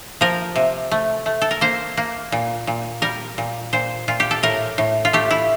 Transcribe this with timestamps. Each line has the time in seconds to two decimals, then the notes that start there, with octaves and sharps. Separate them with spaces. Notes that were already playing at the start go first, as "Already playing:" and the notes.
0.21 F3 A#4
0.56 C3
0.91 A3
1.26 A3
1.42 A4
1.51 A#4
1.61 A#3 C5
1.97 A#3
2.32 A#2
2.67 A#2
3.02 G3 A#4
3.38 A#2
3.73 A#2 C5
4.08 A#2 F4
4.20 G4
4.31 A4
4.43 A2 A#4
4.78 A2
5.05 F4
5.13 A3 G4
5.31 E4